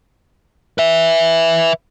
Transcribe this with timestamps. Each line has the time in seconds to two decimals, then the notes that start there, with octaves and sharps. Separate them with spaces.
0.78 B4 E5